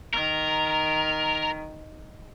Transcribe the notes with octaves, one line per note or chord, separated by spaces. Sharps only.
D#3 A#4